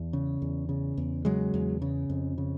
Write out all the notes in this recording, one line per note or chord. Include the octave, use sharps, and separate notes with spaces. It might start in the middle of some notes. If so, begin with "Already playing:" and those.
Already playing: E2
C#3
E2
C#3
E2
C#3 F#3 G#3
E2
C#3
F2
C#3